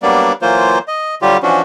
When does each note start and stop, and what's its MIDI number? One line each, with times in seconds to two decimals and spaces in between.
0.03 0.33 54
0.03 0.33 55
0.03 0.33 58
0.03 0.33 59
0.03 0.33 62
0.03 0.33 74
0.42 0.78 52
0.42 0.78 54
0.42 0.78 58
0.42 0.78 65
0.42 0.78 72
0.88 1.15 75
1.22 1.37 50
1.22 1.37 54
1.22 1.37 55
1.22 1.37 65
1.22 1.37 67
1.43 1.62 52
1.43 1.62 53
1.43 1.62 61
1.43 1.62 62
1.43 1.62 66